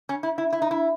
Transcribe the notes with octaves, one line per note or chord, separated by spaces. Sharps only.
C#4
E4
E4
E4
D#4
E4